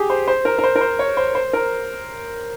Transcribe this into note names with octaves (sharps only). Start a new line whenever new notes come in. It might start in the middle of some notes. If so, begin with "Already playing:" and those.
Already playing: G4 G#4
C5
C5
A#4
A#4
C5
A#4
C5
C#5
C5
C5
A#4